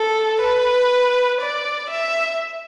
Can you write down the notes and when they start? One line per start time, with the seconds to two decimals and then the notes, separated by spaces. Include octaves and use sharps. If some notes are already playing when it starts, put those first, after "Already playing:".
Already playing: A4
0.42 B4
1.41 D5
1.90 E5